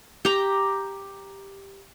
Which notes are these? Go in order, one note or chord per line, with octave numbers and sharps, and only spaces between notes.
G4 A#5